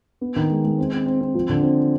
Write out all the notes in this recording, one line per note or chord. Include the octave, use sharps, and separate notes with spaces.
B3
D#3
G#3
G#3
C4
C4
C4
C4
F3
D3
C4